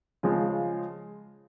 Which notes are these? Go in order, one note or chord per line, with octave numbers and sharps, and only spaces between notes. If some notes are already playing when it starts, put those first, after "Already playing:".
C#3 F3 G#3